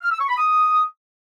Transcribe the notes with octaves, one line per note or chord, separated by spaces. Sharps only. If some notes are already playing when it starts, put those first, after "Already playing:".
F6
E6
C#6
B5
D#6